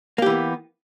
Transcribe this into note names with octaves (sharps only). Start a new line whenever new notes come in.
E3 A#3 B3 G4